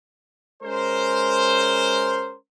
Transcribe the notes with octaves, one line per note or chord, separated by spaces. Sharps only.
G#3 C#4 A#4 C5